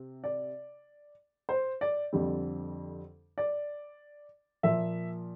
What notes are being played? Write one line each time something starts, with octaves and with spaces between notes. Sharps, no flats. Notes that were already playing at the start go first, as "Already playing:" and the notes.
Already playing: C3 C4
D5
C5
D5
F2 D3 G3 C4
D5
A#2 F3 A#3 E5